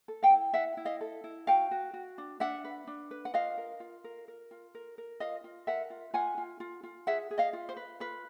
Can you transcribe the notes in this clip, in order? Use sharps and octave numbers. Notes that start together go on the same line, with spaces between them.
A4
F5 G5
E4
E4 E5 F#5
E4
D#5 F5
A4
E4
F#4 F5 G5
F#4
F#4
D4
D4 E5 F#5
B4
D4
B4
F#5
F4 D#5 F5
A#4
F4
A#4
A#4
F4
A#4
A#4
F4 D#5 F5
F4
A#4 E5 F#5
F4
F4 F#5 G#5
F4
F4
F4
G#4 E5 F#5
G#4
D#5 F5
F4
C5
B4
F4 B4